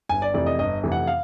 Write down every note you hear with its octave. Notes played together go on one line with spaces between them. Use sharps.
G1 G#5
D5
F2 C3 E3 A3 D5
D#5
G1 D#5
F2 C3 E3 A3
F#5
F5